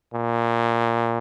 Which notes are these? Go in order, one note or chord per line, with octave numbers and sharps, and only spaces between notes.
A#2